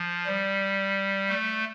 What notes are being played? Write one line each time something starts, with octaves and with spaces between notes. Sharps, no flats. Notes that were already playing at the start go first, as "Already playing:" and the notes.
Already playing: F3
G3
A3